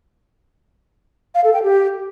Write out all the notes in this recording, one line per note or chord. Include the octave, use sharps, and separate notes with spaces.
F5
A4
G5
G4